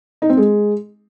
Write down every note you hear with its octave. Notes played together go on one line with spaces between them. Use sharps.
D#4
C4
G#3